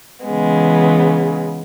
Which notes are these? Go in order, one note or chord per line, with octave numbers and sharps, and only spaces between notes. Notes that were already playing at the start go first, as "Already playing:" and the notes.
C#3 E3 G#3 B3